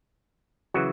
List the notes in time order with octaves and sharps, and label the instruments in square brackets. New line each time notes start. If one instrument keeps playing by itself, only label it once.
[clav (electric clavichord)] C#3 E3 F#3 F#4